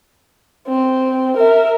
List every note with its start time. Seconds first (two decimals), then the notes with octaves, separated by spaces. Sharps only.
0.68 C4
1.37 A#4 E5